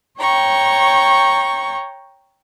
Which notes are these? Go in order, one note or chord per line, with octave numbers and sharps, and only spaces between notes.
C#5 G5 A#5 C#6